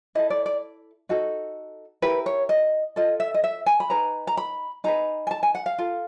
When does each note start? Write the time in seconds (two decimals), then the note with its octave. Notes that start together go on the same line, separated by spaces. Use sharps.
0.15 E4 A4 D#5
0.30 D5
0.46 D5
1.09 D#4 F#4 A4
2.02 E4 G4 A#4 B4
2.26 C#5
2.49 D#5
2.96 F4 A4 D#5
3.20 E5
3.34 D#5
3.44 E5
3.66 G#5
3.80 B5
3.90 D#4 G#4 B4 A#5
4.27 A#5
4.37 B5
4.84 D#4 G#4 B4 A#5
5.27 G#5
5.31 A5
5.43 G#5
5.55 F#5
5.66 F5
5.78 F4 A4